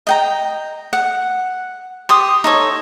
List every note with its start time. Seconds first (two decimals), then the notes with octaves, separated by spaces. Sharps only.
0.07 D#5 G5 A#5
0.93 F#5
2.09 G4 C6 D#6
2.44 D#4 A4 C#5